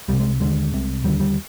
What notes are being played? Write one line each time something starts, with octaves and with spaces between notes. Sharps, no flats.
C2 C3 G3
G#3
D#2 D3 G#3
C2 C3
D#2 D3 G3
G3